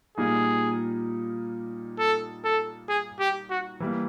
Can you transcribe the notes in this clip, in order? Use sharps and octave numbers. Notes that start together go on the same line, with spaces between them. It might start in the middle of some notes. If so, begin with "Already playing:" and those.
A#2 G3 A#3 D#4 G#4
A4
A4
G#4
G4
F#4
E3 G3 A#3